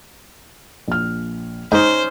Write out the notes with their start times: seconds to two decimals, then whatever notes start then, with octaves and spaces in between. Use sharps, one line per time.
0.88 A#1 F6
1.72 G#2 C#4 D#4 C5